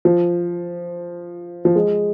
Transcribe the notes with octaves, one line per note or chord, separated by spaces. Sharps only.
F3
F3
G#3